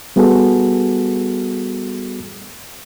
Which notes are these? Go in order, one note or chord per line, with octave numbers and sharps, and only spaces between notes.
G3 B3 F#4 G#4 A4